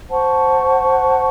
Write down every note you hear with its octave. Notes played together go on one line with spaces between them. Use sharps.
C5 F#5 A5 C#6